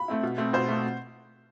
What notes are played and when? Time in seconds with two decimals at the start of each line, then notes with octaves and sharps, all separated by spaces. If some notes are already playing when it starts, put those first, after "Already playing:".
Already playing: B5
0.08 A3 C4 E4
0.23 B2
0.38 A3 C4
0.53 B2 C5
0.69 A3 C4